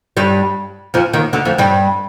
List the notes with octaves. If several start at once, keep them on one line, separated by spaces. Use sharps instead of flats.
G2 G3
F2 F3
D#2 D#3
D2 D3
F2 F3
G2 G3